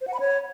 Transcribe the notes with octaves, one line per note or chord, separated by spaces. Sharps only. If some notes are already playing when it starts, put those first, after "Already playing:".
C5
F#5
B5
C#5